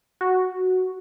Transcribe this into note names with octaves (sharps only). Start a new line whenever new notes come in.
F#4